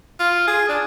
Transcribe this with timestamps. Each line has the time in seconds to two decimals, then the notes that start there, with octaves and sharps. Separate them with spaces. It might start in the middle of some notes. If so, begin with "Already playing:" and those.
0.19 F4
0.47 G#4
0.69 D4